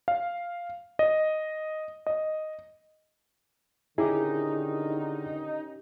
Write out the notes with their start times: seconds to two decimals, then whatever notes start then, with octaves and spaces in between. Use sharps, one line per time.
0.08 F5
0.99 D#5
2.07 D#5
3.98 D3 D#3 C#4 D#4 E4 G4 G#4